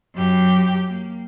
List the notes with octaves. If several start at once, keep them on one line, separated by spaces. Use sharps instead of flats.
F#2 G4
A#3